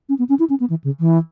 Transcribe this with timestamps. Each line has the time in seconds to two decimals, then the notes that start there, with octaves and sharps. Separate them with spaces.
0.09 C#4
0.19 B3
0.29 C#4
0.39 E4
0.50 C#4
0.60 B3
0.70 E3
0.84 C#3
1.00 E3